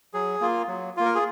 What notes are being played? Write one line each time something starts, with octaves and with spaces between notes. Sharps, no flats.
F#3 G#4
A#3 F4
F#3
A#3 F4
A#4
G#4